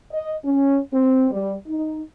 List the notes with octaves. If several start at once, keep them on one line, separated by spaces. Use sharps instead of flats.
D#5
C#4
C4
G3
D#4